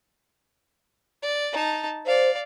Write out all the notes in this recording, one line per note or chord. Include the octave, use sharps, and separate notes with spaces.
D5
D#4 A5
C5 D5 F5